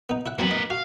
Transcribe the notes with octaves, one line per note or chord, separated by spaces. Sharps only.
B3 D#4
E4 E5 F#5
E3 F#3 A#3 C4 B4
D#5
F#4 F5